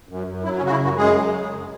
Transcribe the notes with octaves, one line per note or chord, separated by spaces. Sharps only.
F#2
F#2
F#3 E4
C#4
C#3 F#4
E4
F#2 F#3 F#4
F#2 G#3 G#4
F#3
C#3
F#2